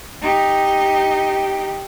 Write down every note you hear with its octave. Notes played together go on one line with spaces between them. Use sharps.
D#4 G4